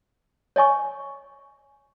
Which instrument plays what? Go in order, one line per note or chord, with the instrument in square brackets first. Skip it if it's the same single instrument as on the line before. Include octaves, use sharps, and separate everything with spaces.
[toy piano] C#5 D#5 G#5 C#6